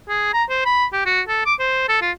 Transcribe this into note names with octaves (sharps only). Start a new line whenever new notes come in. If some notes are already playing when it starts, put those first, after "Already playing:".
G#4
A#5
C5
B5
G4
F#4
A4
D6
C5
A4
F4